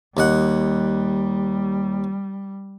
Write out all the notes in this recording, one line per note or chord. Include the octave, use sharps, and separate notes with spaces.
D#2 G3 D#5 F#5